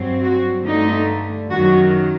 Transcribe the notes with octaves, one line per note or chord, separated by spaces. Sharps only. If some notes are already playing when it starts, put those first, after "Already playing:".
Already playing: G2 F#3 C4
F#4
G2 D3 A3 D#4
F#2 D#3 F#3 F#4